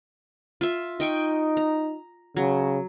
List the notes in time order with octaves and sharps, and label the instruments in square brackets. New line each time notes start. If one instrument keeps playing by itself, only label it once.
[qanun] F4 E5
[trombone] D#4 [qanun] D#5 G5 C#6
[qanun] A#5
[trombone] C#3 [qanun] F#3